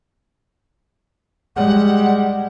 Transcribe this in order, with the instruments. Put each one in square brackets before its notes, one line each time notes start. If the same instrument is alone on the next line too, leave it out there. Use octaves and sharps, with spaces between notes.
[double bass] G3 G#3 [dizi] F#5